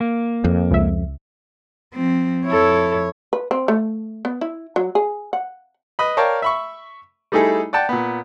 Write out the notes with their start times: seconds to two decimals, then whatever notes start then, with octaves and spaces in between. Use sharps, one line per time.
0.01 A#3
0.44 F2
0.71 C#2 E5
1.94 F3 C4
2.46 F2 E4 A4 C#5
3.33 B4
3.51 C4
3.68 A3
4.25 B3
4.41 E4
4.76 F#3
4.95 G#4
5.33 F#5
5.99 B4 D#5 B5
6.17 A#4 C#5 D5 F5 G5 A5
6.42 E5 B5 C#6
7.32 G3 A3 D#4 E4 G#4 A4
7.73 D5 F#5 G5 A5
7.89 A#2 B3